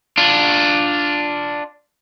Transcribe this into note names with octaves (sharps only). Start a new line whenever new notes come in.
D4 F4